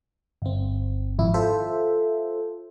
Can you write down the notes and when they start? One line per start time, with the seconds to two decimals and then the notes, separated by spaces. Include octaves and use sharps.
0.42 G1 C4
1.18 G#1 F2 E4
1.34 F4 A4 C5 E5